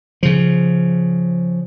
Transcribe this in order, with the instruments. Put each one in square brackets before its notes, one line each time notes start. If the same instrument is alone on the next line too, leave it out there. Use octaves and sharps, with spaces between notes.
[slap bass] C#3 F3